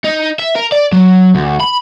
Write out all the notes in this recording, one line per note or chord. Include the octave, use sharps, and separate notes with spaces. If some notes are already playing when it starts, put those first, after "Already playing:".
D#4
E5
A#4
D5
F#3
D2
B5